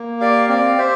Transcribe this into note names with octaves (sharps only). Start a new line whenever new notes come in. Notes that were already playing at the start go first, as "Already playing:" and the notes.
Already playing: A#3
G4 D5 F5
C4 D5 F5
G4 C5 E5